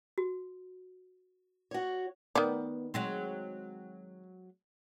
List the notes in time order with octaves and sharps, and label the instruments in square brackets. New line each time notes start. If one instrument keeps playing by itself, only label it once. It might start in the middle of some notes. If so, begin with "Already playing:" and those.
[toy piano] F#4
[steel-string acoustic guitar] F#4 C#5
[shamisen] D#3 D5 [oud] B3
[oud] F#3 G#3 C4